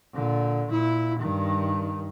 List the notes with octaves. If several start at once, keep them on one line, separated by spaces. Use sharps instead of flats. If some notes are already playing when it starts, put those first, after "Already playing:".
A#2 D3
A#2 E4
G2 D#3